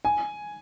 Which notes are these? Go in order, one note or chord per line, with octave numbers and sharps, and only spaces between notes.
G#5